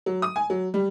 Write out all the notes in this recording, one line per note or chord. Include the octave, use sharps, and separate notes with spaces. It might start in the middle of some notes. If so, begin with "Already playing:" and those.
F#3
D#6
G#5
F#3
G3